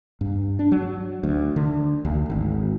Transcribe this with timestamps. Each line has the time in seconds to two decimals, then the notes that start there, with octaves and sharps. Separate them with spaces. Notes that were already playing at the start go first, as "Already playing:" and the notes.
0.21 G2
0.59 D4
0.72 F#3
1.23 D2
1.56 D3
2.05 D2
2.30 G#1